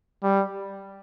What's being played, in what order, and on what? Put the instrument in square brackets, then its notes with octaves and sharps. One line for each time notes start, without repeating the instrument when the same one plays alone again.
[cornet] G3